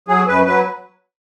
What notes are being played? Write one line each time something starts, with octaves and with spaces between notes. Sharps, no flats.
F#3 G#4
F#2 B4
F#3 B4